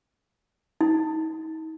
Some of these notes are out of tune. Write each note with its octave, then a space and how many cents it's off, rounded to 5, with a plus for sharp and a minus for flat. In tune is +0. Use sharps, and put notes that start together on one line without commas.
D#4 +40